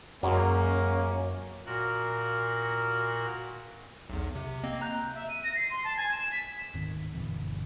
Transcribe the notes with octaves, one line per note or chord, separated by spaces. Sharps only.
F#2 F#3 G#3 A#3 C#4
A#2 F#4 A#4 F#6
B1 E2
C3
A#3 C4 D#5
A#5 F#6 G6
E5
D#7
A#6
C7
C6
A5
G#5
E7
B6
D1 G#2 D#3 C4
F#1 A#2 D3 E3